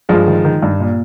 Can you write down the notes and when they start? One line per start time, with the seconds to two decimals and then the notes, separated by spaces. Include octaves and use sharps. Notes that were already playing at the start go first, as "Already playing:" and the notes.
0.09 G2 F3 G#3
0.27 D#3
0.45 D#3
0.62 G2
0.80 A#2